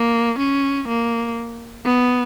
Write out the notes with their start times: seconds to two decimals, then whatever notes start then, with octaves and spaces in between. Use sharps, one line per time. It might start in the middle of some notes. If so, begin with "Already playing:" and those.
Already playing: A#3
0.39 C#4
0.88 A#3
1.85 B3